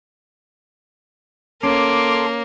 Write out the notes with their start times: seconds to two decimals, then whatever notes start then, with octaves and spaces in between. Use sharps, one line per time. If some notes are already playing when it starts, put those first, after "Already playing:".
1.63 A#3 C#4 A4 C6 D6